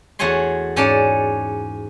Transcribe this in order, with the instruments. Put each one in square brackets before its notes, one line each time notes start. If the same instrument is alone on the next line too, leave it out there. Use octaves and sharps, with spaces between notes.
[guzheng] E2 A3 F#4 C#5 G#5 C6
G#2 C#4 C#5 D5 A5